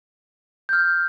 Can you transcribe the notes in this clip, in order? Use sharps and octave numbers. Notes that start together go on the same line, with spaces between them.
G6
F6